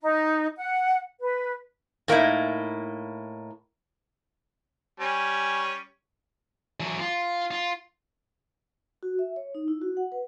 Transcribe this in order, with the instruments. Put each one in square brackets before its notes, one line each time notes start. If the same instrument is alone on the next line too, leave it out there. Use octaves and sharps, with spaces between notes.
[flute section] D#4
F#5
B4
[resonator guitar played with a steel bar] A2 A#3 D#4 E4
[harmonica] G3 C#4 [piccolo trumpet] G#5
[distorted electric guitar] E3 F#3
F4
F4
[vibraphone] F#4
E5
C#5
D#4
E4
F#4
F#5
B4